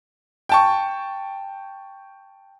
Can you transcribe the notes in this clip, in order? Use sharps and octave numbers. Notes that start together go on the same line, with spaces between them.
G5 A5 C#6